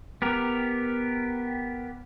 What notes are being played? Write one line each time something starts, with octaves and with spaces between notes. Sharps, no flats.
B3 G4 A#4